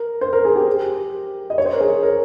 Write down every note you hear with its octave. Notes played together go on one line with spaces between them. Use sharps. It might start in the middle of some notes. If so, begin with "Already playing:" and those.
Already playing: A#4
C5
A#4
G#4
G4
D#5
C#5
C5
A#4
G#4
A#4